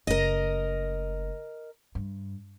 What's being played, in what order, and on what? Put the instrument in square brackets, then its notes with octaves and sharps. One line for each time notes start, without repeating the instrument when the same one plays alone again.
[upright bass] F#1 A3 [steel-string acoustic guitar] A#4 D#5
[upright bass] G2